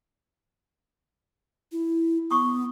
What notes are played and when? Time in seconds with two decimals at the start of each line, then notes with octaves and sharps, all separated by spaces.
1.72 E4
2.31 B3 C#6 D#6